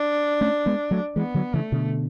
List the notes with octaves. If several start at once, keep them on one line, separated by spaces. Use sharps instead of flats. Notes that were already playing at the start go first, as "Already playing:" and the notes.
Already playing: D4
A3 C#4
G#3 B3
F#3 A3
E3 G#3 B3
D3 F#3
C#3 E3 A3
B2 D3